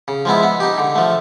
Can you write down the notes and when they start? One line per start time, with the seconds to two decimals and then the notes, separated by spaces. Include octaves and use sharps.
0.08 C#3
0.25 F3 G#3 B3 E4
0.43 B3
0.60 D#4 G4
0.78 D3
0.96 F3 A3